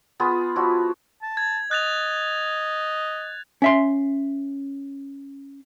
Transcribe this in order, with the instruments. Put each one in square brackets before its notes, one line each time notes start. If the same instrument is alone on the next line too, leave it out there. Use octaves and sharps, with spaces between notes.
[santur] B3 F4 G#4 B5
F3 E4 F#4
[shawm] A5
[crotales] G#6
[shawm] D#5 [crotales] F#6 A6 F7
[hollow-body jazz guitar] C#4 E5 C6